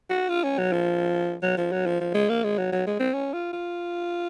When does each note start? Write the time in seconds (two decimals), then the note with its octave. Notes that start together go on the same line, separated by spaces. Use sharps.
0.10 F#4
0.29 F4
0.44 C#4
0.58 F#3
0.72 F3
1.43 F#3
1.57 F3
1.72 F#3
1.87 F3
2.01 F3
2.14 G#3
2.29 A#3
2.44 G#3
2.58 F#3
2.72 F#3
2.87 G#3
3.00 C4
3.14 C#4
3.34 F4
3.53 F4